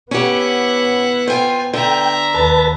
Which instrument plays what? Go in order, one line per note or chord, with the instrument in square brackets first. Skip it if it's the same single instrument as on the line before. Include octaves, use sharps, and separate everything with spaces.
[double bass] B3 [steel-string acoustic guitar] C#4 G4 [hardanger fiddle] E4 F#5
[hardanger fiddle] F4 G#5 [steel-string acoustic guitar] C5 G5
[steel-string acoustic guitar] D3 [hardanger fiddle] E5 A#5 [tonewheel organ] G5
[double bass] D#2 [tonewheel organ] B4 A5